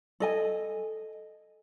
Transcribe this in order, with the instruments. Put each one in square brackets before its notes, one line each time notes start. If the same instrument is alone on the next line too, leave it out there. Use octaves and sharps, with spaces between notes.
[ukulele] A4 D#5 G#5